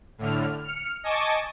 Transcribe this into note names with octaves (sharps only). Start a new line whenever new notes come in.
A2 D3 F6
F6 C#7
D#5 G#5 A5 C#6 D6